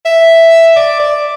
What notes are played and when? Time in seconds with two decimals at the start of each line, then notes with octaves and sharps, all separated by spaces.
0.05 E5
0.76 D5
1.00 D5